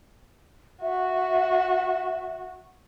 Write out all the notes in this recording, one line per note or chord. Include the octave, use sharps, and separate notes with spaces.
F#4 E5